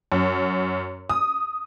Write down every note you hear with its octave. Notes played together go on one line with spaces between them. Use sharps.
F#2
D#6